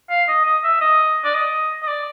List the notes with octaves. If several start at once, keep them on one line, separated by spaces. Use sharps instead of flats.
F5
D#5
D#5
E5
D#5
D5
D#5
D#5
D5